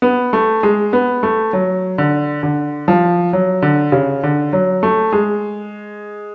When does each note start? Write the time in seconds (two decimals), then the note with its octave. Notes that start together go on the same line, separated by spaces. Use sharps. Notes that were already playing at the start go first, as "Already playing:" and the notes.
0.02 B3
0.33 A3
0.63 G#3
0.93 B3
1.23 A3
1.53 F#3
1.98 D3
2.43 D3
2.88 F3
3.33 F#3
3.62 D3
3.92 C#3
4.23 D3
4.53 F#3
4.83 A3
5.12 G#3